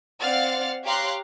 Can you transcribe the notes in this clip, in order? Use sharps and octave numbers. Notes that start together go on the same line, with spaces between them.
C4 D5 F5 F#5 F6 A6
G4 C#5 F5 A#5 C6 F#6